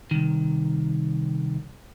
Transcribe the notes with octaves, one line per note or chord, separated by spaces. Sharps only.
C2 D#3